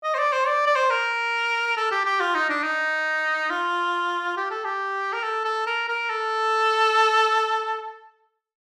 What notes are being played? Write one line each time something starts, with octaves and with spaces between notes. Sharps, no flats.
D#5
C5
D5
C5
D5
D5
C5
A#4
A4
G4
G4
F4
D#4
D4
D#4
F4
G4
A4
G4
A#4
A4
A4
A#4
A#4
A4